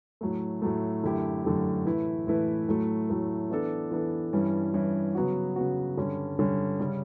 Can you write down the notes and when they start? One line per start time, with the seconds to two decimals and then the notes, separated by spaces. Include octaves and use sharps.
0.21 A2 F#3 A3
0.62 A2 F#3 A3
1.03 F#2 D3 A3 E4 G4
1.44 F#2 D3 A3 E4 G4
1.85 A2 E3 A3 E4 B4
2.27 A2 E3 A3 E4 B4
2.69 A2 F#3 A3
3.10 A2 F#3 A3
3.50 E3 B3 D4 A4
3.91 E3 B3 D4 A4
4.33 G2 E3 G3 C#4
4.74 G2 E3 G3 C#4
5.15 C#3 F#3 B3 F#4
5.56 C#3 F#3 B3 F#4
5.97 G2 D3 G3 C#4
6.38 G2 D3 G3 C#4
6.80 C#3 G3 C#4